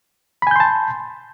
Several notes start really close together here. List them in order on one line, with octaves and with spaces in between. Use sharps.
B5 G#5 G6 C6 A5